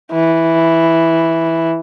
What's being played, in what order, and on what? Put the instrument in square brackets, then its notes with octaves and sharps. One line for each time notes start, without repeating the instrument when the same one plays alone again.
[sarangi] E3